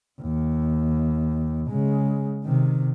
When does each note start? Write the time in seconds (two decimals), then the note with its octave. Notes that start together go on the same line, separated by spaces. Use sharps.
0.21 D#2
1.69 C#3 G#3
2.44 C3 D#3